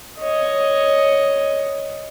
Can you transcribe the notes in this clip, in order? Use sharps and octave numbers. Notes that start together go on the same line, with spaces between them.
C#5 D#5